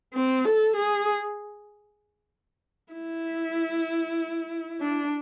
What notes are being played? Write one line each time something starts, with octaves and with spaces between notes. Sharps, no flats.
C4
A4
G#4
E4
D4